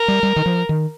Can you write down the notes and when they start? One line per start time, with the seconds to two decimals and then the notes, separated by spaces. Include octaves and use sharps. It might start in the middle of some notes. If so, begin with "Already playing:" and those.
Already playing: A#4
0.08 G3
0.23 G3
0.36 D#3
0.46 F3
0.69 D#3